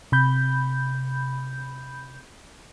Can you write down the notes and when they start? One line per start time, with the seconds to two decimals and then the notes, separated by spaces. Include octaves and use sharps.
0.12 C3 B5 G6